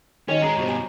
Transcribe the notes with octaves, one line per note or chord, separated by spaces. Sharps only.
D#3 C#4 F#4 C#5 D#5
G#3 G#4 A#5
G2 B2 F#4 G4 C5
G#5